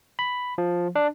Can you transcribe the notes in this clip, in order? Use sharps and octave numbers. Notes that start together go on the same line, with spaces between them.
B5
F3
D4